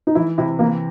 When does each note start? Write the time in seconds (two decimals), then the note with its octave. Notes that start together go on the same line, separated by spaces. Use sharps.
0.07 D#4
0.15 E3 E4
0.38 C3 E4
0.59 E3 A#3